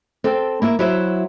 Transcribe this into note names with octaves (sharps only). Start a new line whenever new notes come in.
C4 A4 G5
A#3 E4 E5
F#3 E4 F#4 C5 E5